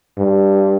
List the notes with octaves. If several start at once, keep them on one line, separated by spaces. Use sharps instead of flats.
G2